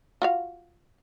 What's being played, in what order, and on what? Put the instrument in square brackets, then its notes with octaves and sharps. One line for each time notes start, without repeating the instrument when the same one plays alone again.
[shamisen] F4 F#4 F5